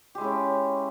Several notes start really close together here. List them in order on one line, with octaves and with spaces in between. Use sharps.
G4 G#3 E4 C#4